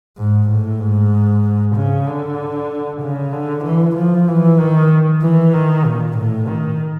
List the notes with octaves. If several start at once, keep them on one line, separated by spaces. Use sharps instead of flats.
G#2
A2
G#2
C#3
D3
C#3
D3
E3
F3
E3
D#3
E3
D#3
A#2
A2
D#3